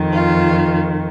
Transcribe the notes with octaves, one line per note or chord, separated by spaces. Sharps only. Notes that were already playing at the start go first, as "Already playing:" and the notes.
Already playing: F2 D#3
F4